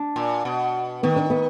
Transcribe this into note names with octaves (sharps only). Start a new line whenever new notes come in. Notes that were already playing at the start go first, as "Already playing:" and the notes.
Already playing: D4
A#2
B2
D#3 B3
D4
B3